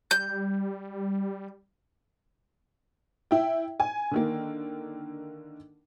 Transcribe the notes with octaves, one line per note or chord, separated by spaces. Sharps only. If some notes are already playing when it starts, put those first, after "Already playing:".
G3 G6
E4 G5
G#5
D3 D#3 A#3